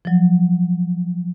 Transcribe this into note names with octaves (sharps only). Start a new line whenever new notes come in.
F3 F#3